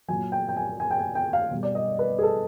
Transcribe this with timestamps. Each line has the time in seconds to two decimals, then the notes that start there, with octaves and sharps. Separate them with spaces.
0.08 A#2 F#3 G#5
0.32 G5
0.49 G5
0.56 G#5
0.80 G#5
0.91 G5
0.98 G#5
1.15 G5
1.33 F5
1.51 B2 G3
1.63 D5
1.75 D#5
1.99 B4
2.19 G#4
2.23 A4